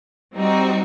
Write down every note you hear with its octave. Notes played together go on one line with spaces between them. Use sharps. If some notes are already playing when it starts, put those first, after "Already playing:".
G3 C4 D#4 F#4